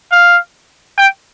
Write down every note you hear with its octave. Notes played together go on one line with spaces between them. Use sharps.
F5
G5